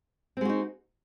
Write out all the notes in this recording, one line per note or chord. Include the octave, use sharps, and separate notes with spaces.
G#3 C4 D#4 F#4